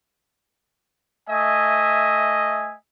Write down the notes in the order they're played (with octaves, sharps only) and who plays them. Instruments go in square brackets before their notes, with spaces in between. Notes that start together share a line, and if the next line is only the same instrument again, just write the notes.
[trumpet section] A3 D#5 E5 G#5